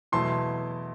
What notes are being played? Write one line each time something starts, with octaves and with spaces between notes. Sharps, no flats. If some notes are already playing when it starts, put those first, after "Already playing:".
E2 B2 F#3 A3 E4 A5 C6